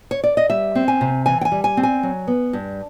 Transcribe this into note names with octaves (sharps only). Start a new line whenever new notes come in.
C#5
D5
D#5
G3 E5
C4
G#5
C3
E3 G#5
G5
G#5
G3
G#5
C4
G#5
F#3
B3
G2